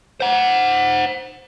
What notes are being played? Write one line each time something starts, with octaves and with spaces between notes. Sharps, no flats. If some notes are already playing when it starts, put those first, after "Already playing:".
C5 F#5